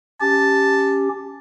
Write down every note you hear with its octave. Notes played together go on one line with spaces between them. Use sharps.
C#4 G4 A5